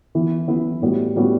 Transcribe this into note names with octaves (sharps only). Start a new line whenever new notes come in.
E3 B3 E4
E3 B3 E4
A2 G3 B3 F#4
A2 G3 B3 F#4